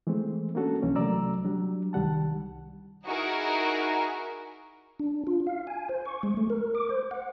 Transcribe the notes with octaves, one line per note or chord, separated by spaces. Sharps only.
E3 G#3 A3 C4
A#3 C#4 D4 F#4 A4
C2 E3 A#3 C#4
C3 F#3 A3 D5 A#5 E6
F#3 G3 D4
C2 D#3 G3 F#5 A5
D#4 E4 F#4 G#4 A#4
D4
F4
F5
G#5
C5
C#6
G#3
A3
A#4
D6
C5
F#5